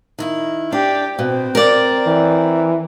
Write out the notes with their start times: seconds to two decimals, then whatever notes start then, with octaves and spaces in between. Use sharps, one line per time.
0.19 D#3 E4
0.72 D4 G4
1.19 B2 C4
1.55 A#4 D5
2.07 E3